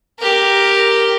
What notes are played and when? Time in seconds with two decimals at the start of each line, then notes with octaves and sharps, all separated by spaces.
0.19 G4 A#4